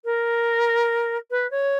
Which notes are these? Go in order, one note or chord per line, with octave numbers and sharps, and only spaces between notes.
A#4
B4
C#5